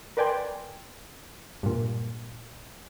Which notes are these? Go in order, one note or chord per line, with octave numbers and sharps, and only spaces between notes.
A#4 B4 D5 G5 G#5 C6
G2 A#2